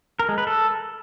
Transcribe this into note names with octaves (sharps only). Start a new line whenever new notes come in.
A#4
G#3
B4
A4